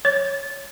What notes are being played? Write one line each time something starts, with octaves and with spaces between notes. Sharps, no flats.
C#5